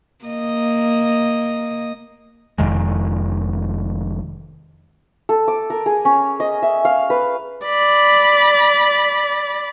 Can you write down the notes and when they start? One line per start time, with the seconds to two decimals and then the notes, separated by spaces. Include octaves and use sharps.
0.25 A#3 D#5
2.58 F1 F2 D#3 G#3
5.29 A4
5.48 D6
5.70 A#4
5.86 G#4
6.05 C#4
6.40 D#5
6.63 E5
6.85 F5
7.10 B4
7.66 D5 B5